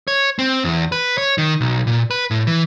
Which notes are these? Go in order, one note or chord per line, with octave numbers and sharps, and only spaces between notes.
C#5
C4
E2
B4
C#5
D#3
B1
A#2
B4
A2
E3